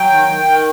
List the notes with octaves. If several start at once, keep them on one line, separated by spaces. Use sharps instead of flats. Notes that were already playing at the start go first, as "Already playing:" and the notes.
Already playing: F#3 G5
D#3
D#3
D#3